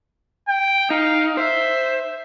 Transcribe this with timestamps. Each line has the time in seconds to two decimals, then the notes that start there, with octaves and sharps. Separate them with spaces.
0.48 G5
0.90 D#4 F5
1.37 C5 E5